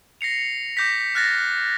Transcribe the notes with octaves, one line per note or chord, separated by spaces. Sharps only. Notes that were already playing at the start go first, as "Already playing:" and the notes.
A#6 C7 C#7 F7
D6 G6 A#6 B6
F6 F#6 A6 A#6
F#6